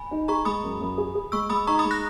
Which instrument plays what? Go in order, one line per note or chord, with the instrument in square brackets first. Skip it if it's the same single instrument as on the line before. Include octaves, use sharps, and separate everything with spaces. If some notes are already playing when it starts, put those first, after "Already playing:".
Already playing: [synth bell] G#5 B5
[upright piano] D#4
[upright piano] G#4 [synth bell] A#5 C#6
[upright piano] G#3 [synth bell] B5 D#6
[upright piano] F#2
F#2
G#4
G#4
[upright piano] G#3 [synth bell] C#6 E6
[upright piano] G#3 [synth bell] B5 D#6
[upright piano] D#4 [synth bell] A#5 C#6
[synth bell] B5 D#6
[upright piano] G#3
[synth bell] F#6 A#6